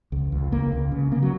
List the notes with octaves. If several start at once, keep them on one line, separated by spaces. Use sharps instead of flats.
C#2
C#2
C#2 A#3
C#2
C#3
C#3 A#3
F#3